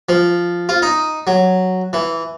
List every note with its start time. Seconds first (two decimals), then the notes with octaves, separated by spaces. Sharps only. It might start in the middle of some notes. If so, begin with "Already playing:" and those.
0.09 F3
0.69 F4
0.82 D#4
1.27 F#3
1.93 E3